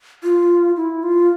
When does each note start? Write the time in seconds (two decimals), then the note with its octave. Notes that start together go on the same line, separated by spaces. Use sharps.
0.23 F4
0.76 E4
1.03 F4